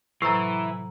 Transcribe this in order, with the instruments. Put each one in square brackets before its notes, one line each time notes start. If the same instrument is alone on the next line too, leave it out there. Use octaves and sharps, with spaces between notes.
[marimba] A2 C3 F#3 [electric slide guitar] E3 [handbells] A#5 E6